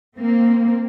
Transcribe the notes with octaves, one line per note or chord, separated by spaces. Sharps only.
A#3 C4